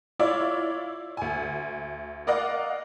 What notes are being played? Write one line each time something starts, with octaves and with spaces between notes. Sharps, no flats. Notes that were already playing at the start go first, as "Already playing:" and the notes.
E4 F4 C#5 D5
D2 G#5
A#4 D5 D#5 F5 F#5